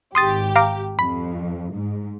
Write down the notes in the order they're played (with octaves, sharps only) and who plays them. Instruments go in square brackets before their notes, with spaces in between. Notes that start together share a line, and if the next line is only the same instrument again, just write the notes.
[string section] G#1 G4 [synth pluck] C6 D#6 A6
[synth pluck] F5 A#5 D6
[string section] F2 [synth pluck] B5
[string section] G#2